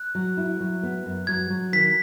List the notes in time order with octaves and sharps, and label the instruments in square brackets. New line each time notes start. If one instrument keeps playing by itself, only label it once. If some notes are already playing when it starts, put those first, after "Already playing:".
Already playing: [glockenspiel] F#6
[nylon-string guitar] F#3
E4
F#3
B3
F#2
[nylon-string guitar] F#3 [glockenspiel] G#6
[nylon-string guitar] F#3
[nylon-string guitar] D#3 [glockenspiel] B6